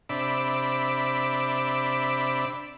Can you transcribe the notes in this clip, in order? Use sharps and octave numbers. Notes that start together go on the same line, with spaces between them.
C3 D4 D5 E5 B5